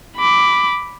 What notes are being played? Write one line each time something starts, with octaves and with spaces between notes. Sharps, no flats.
B5 D6